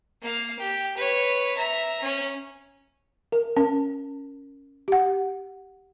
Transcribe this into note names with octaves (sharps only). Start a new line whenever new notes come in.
A#3 F5
G4
B4 C#5
E5 A#5
C#4
A#4
C#4 A#4
G4 F#5